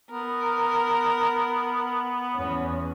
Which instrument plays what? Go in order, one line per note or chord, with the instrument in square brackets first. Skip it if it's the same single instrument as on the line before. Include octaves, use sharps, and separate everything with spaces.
[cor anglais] B3 [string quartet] A#4
[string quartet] E2 C#4